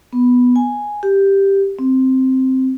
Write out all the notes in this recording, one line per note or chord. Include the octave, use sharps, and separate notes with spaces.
B3
G#5
G4
C4